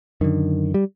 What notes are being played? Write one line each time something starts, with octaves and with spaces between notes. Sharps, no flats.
F#2 D3 D#3
G3